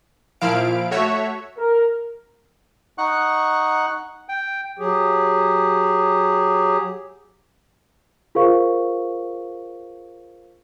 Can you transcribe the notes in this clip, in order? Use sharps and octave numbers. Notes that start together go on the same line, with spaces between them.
A#2 F3 E4 F5 D7
A3 F#4 C#5 E5
A#4
D#4 F#5 C#6 F#6
G5
F#3 G4 G#4
F4 G#4 A#4 C5 F5 C#6